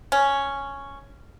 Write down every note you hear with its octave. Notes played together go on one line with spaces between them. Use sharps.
C#4